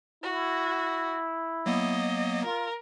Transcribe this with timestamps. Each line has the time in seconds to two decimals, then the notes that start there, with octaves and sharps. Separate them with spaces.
0.23 E4 F#4
1.66 F#3 A#3 B3 D#5
2.44 F4 A#4